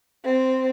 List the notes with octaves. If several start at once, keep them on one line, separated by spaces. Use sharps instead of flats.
C4